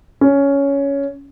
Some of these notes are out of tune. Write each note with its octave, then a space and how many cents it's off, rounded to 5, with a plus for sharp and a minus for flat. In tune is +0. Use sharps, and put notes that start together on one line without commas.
C#4 +10